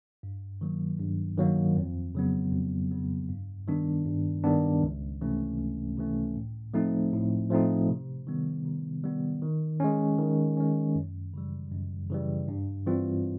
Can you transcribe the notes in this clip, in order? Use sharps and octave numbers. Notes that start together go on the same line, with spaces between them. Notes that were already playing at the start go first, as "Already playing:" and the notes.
G2
D#3 F#3 A#3
G2
D#3 F#3 A#3
F2
C#3 F#3 B3
F2
C#3 F#3 B3
G2
D#3 G3 B3 D4
G2
D#3 G3 B3 D4
C#2
C3 E3 A3 C#4
C#2
C3 E3 A3 C#4
A2
F3 A3 C4 D#4
A2
F3 A3 C4 D#4
C3
D#3 G3 B3
C3
D#3 G3 B3
D#3
G#3 C#4
D#3
G#3 C#4
F#2
C#3 E3 G3
F#2
C#3 E3 G3
G2
E3 G3 C4 F4